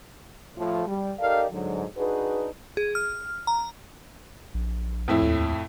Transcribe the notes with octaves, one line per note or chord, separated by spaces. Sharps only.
A2 F3
G3
D#4 G4 A4 A#4 D5 F5
G#2 D3 F#3
D4 D#4 F#4 G#4 B4
G#4
F6
A#5
A#1
F2 A2 E4
D#2